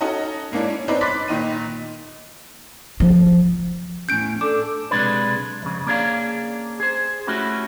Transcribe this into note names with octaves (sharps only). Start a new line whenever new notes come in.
C#4 D#4 F#4 A4 D#5
G#2 A#3 C#4 D4 E4
C#4
C4 D4 D#4 B4 C#5 D5
B5 C6 D6 F#6 A6 B6
A#2 D#3 D#4 D#7
F3
E2 A2 C#4 G6 D7
D4 A4 D6
B1 C3 G#3 D4 B4
F2 C#3
A#3 C#4 D4 G#4 D5 F5
G#4 C5
A3 C#4 E4 F#4 G4